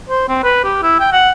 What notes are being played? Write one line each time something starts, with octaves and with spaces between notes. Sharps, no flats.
C5
C4
B4
G4
E4
G5
F#5